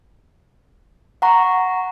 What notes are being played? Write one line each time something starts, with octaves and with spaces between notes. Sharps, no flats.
F#5 A#5 C#6